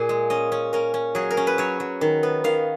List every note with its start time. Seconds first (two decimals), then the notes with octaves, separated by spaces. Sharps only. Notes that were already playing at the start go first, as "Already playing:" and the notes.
Already playing: A#2 G#4
0.09 G#3
0.30 C#4 D#5
0.52 C#4
0.73 C#4 A#4
0.94 C#4
1.15 F#3 G#4
1.31 A#4
1.37 C#4
1.47 B4
1.58 F#3 C#5
1.80 F#3
2.01 D#3
2.23 B3
2.44 D#3 F5